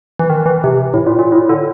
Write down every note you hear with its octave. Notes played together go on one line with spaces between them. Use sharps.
E3
D#3
E3
C3
A2
A#2
A#2
A2
D3